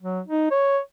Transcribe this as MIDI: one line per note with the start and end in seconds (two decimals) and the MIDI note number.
0.02 0.20 54
0.26 0.47 63
0.51 0.78 73